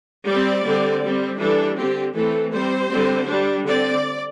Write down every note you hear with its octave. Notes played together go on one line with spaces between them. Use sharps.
G3 C4 D5
D3 G3 C4
G3 C4
E3 G3 D4 A4
D3 C4 G4
E3 A3 C4 A4
G3 C4 C5
D3 G3 C4
G3 D4
D3 C4 D5